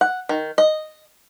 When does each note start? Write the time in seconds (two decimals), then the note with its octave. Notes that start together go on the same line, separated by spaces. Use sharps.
0.01 F#5
0.29 D#3
0.58 D#5